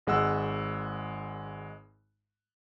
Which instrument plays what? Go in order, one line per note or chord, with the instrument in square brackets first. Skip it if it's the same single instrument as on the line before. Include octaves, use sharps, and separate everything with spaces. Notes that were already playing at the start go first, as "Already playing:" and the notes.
[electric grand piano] G#1 G#3 F#5 E6